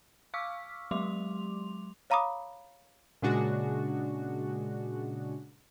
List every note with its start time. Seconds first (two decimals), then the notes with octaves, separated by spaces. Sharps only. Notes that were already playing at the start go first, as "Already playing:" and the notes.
0.34 F5 C#6 D6 E6 F6 B6
0.91 F#3 G#3 G4 C6 D6 F7
2.10 C#5 F5 A#5 B5 D6 D#6
3.22 A#2 C#3 G#3 D4 F#4